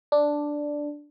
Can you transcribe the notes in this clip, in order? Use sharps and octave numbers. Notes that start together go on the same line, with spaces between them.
D4